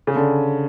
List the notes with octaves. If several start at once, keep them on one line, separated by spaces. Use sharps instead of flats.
C#3
D3